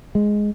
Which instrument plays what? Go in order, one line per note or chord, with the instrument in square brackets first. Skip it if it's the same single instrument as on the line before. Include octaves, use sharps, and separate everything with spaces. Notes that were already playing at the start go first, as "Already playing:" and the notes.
[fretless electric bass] G#3